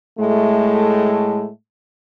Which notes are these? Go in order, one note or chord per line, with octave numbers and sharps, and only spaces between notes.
A2 G#3 A3